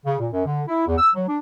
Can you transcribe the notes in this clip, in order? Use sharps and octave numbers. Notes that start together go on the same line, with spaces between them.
C#3
A#2
F#2
D3
E4
E2
E6
F#3
D4